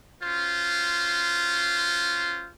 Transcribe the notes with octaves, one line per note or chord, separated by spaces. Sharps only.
C#4 F4 F#4 C5